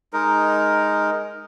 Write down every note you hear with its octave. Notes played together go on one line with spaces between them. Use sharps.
G#3 D#4 A#4